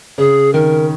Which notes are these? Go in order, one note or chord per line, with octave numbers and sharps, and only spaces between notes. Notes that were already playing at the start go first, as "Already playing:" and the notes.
C#3 G#4
D#3 A#4